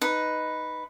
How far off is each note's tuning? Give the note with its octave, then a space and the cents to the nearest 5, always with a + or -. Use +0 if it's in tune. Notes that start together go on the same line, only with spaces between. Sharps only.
D#4 +0 B4 +0